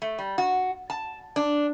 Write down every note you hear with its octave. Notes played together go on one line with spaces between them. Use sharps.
A3
G3
F#4
A5
D4